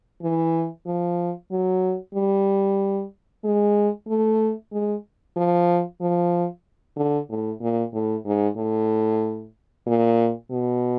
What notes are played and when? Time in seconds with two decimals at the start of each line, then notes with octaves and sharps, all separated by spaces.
0.22 E3
0.86 F3
1.51 F#3
2.14 G3
3.44 G#3
4.08 A3
4.72 G#3
5.36 F3
6.01 F3
6.96 D3
7.29 A2
7.61 A#2
7.93 A2
8.25 G#2
8.57 A2
9.87 A#2
10.51 B2